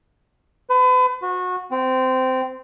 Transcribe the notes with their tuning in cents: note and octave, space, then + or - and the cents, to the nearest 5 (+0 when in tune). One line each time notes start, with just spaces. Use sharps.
B4 +40
F#4 -25
C4 -15